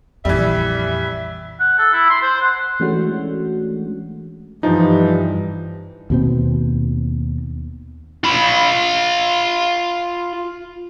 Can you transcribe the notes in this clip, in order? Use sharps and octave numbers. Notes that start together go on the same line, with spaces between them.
A#1 F2 E3 G3 E5
F#5
A4
E4
C6
C5
F#5
E3 G#3 A3 C#4 D4 F#4
G2 E3 F3 G3 D#4
D#2 B2 C4
F4 B5